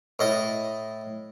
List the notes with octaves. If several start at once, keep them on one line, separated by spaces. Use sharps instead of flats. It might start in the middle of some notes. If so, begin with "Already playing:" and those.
A2 D#5